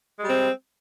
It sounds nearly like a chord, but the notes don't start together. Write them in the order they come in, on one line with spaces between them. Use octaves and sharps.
G#3 G3 C4